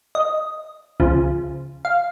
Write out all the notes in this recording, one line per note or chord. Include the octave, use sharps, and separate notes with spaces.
D#5
C#2 C#3 F3
F5